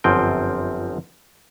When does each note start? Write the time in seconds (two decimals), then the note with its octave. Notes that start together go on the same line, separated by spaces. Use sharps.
0.04 G1 F#2 F3 C4 G5